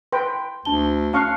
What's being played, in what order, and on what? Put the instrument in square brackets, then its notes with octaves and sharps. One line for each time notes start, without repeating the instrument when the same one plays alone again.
[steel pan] B4 G5 [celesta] C6
[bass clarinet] D2 [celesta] D4 A5 G7
[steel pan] C#4 F5 C#6 [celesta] A5 F6 F#6